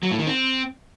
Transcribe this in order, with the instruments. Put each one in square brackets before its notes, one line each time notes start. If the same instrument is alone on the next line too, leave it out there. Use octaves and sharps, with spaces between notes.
[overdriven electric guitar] F#3
A2
D#3
C4